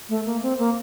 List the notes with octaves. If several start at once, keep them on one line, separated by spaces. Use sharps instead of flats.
A3
A#3
C4
A#3